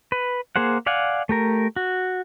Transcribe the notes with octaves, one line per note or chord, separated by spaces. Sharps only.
B4
A#3 G#4 C5 F#5
D5 F5 F#5 G#5
A3 G4 A#4
F#4